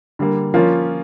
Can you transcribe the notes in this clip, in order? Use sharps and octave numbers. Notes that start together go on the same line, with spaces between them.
D3 G3 A#3
F3 A#3 C#4 F4